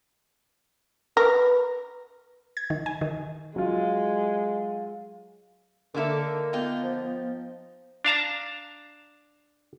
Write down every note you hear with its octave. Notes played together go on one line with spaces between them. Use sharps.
A#4 B4
G#6
D#3
G#5
D#3
F#3 G#3 F4
D3 D#3 A#3 A4 E5 D6
B3 D#4 F4 G5
F3
D4 F5 A5 A#5